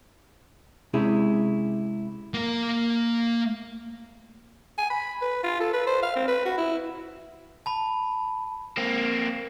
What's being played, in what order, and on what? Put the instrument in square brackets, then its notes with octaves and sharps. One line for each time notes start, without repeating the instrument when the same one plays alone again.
[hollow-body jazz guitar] C3 G#3 C#4 E4 G4 G#4
[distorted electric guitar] A#3 A#4
[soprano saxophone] G#5
B5
B4
F4
A4
B4
C5
F5
C4
B4
F#4
E4
[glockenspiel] A5 B5
[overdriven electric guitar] A#3 C4